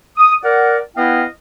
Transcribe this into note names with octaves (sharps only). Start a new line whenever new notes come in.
D#6
A#4 D5 F#5
B3 E4 B4 D#5 F5 G5